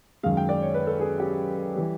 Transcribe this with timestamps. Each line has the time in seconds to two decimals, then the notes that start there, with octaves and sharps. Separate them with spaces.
0.23 F#2 D#3 G#3 F5
0.37 G5
0.49 D5
0.62 C#5
0.74 B4
0.87 A4
1.00 G#4
1.20 G4
1.76 E3 G3